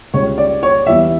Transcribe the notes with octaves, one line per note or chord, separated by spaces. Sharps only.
C#2 C#3 G3 C#5
D5
C#5
E2 E3 G3 E5